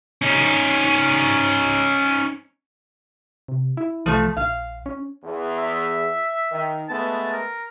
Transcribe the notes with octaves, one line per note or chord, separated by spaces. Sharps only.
C#4 D#4
C3
E4
C2 F3 A3
A#1 F5
C#4
E2
E5
D#3
G#3 A3 B3 A5
A#4